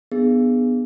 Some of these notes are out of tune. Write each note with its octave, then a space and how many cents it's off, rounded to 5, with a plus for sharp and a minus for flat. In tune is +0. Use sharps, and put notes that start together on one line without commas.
B3 +0 D4 +35 G#4 +0